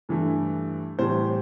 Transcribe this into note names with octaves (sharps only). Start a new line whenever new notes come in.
G2 E3 A3
A2 E3 G3 C5